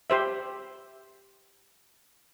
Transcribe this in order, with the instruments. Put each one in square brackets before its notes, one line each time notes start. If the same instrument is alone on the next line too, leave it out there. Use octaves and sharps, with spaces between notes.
[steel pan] G4 C5 E5